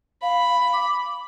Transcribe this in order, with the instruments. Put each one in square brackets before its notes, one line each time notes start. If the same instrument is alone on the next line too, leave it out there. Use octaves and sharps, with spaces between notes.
[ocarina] F5 [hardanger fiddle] B5
[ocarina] D6